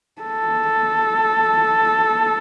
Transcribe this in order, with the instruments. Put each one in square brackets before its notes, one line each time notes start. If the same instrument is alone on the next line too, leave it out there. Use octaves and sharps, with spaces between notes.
[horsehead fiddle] A4